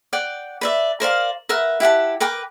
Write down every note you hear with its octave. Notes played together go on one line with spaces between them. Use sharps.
D5 F#5 G5
B4 D5 E5
A#4 C5 D5 F5
A#4 B4 E5 F#5
E4 G4 F#5 A5
A#4 B4 G5 D6